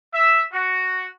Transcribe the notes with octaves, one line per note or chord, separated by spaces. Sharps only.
E5
F#4